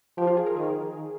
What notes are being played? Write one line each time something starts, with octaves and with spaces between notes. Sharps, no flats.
F3 G4
F4
G#4
A#4
D#3 G#4